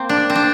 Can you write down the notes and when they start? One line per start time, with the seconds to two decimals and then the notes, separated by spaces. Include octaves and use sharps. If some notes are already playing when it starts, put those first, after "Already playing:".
Already playing: A#3 C4
0.09 D4
0.30 C4
0.35 D4